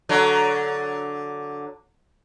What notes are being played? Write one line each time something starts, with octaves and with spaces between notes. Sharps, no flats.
D3 F#3